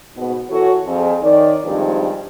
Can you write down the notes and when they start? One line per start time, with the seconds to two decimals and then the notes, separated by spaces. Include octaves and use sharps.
0.16 G#2 B2 B3
0.49 E3 F#4 A4 C#5
0.85 F2 G#4
1.22 D#3 C#5 D5
1.64 D2 G2 D#3 F3 G#3 C4